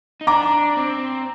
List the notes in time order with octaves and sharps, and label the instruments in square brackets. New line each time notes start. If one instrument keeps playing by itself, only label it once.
[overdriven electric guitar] D#4
[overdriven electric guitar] D4 [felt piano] A#5 D6
[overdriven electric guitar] C4